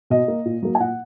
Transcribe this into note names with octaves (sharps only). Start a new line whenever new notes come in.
B2 D#5
A#3
A#2
F#3 A#3
G#5
A#2 F#5